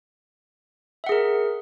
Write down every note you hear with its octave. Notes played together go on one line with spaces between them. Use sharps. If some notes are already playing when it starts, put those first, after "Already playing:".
G#4 A#4 E5 F#5